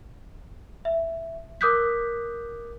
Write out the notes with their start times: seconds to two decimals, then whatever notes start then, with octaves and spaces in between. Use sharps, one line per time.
0.85 E5
1.61 A#4 D6 D#6 F#6 G6 B6